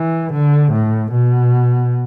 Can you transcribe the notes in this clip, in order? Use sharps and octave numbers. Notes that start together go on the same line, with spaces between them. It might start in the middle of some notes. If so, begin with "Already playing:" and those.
Already playing: E3
D3
A2
B2